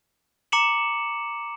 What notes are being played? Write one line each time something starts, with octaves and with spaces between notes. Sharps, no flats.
A#5 D6 C#7 E7 F#7